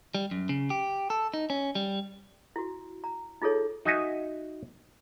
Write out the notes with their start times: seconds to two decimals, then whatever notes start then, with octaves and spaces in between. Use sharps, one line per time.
0.15 G3
0.31 F#2
0.49 C#3
0.70 G4
1.10 A4
1.34 D#4
1.50 C#4
1.75 G3
2.56 E4 F#4
3.04 A#5
3.42 D#4 F4 G#4 A4 C#5
3.85 D#4 F#4 D#5 E5 G#5